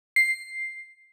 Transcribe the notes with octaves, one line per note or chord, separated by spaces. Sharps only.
C7